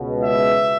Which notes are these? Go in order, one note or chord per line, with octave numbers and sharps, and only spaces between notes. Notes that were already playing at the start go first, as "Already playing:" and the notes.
Already playing: C#2 B2
E5